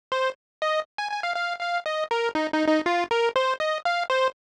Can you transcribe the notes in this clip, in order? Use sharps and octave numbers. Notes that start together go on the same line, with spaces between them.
C5
D#5
G#5
G#5
F5
F5
F5
D#5
A#4
D#4
D#4
D#4
F4
A#4
C5
D#5
F5
C5